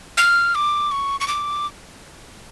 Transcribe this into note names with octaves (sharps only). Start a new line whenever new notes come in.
F6
D6
C#6
C#6
D6